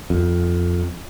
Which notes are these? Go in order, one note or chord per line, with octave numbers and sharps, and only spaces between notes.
F2